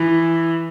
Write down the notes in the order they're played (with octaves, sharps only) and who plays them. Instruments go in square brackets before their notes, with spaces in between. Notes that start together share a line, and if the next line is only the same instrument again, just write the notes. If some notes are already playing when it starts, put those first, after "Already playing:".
Already playing: [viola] E3